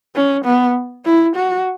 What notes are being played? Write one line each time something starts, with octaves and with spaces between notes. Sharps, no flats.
C#4
B3
E4
F#4